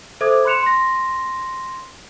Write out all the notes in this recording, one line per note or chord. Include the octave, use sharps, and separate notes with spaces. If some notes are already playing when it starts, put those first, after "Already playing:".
A4 C5 E5 D6 D#6 G#6
B5 C6 F#6 C#7 E7 F7
C6 A#6